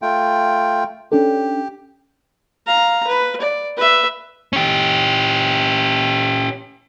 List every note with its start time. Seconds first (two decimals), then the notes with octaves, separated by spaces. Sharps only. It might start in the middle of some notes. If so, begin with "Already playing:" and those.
0.02 A3 F4 G5
1.12 C#4 D4 G4 A4
2.67 F5 A#5
3.07 B4
3.41 D5
3.77 B4 E5
4.53 C#4 G4